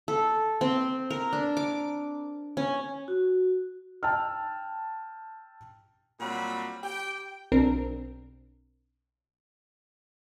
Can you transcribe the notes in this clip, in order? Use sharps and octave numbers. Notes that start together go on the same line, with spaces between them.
A4
C4
A#4
D4
D6
C#4
F#4
G5 A5 E6 F6
A#2 F#3 G3 C4 B5
G4 G5
B1 C4 D4 A#4